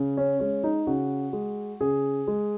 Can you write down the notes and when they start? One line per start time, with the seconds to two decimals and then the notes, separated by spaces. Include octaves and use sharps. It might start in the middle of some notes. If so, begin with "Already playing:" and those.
Already playing: C#3
0.17 C#4
0.40 G#3 C#4
0.64 D#4
0.87 C#3 F#4
1.33 G#3
1.81 C#3 G#4
2.28 G#3